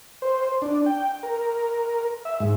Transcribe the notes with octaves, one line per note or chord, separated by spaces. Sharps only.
C5
D4
G5
A#4
E5
G#2